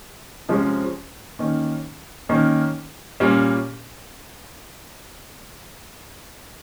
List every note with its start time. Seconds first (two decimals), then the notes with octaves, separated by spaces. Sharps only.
0.49 C3 F3 G#3 C#4
1.39 D#3 A#3 C#4
2.29 D#3 A#3 C#4
3.20 A#2 G3 A#3 C#4